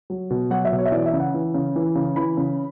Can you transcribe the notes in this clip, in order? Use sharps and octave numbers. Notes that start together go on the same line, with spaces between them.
F#3
B2
F#3 F#5
E5
B2
C#5
E5
E3 D5
E5
C#3
F#5
E3
C#3
E3
C#3
E3 B5
C#3